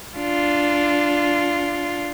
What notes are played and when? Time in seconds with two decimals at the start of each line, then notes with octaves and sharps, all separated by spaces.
0.17 D4 F4